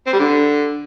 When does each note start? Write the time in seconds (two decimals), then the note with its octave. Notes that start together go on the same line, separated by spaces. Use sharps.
0.07 C4
0.13 G3
0.19 D3